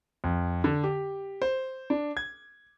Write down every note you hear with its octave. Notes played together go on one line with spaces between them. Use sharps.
F2
D3
G4
C5
D4
G#6